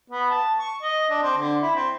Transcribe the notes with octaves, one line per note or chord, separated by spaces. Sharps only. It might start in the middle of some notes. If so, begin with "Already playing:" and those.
B3
A5
C#6
D#5
D4
C4
D3
E4
C4